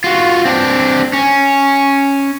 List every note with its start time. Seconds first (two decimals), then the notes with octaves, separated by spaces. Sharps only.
0.04 F4 F#4
0.45 C4 D4
1.13 C#4